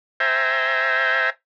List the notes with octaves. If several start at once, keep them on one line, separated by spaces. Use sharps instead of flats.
C5 E5 G5 G#5 A#5